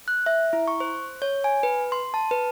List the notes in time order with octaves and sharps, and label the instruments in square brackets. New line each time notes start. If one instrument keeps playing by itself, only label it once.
[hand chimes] F#6
E5
E4
C#6
C5
C#5
G#5
B4
C6
A5
B4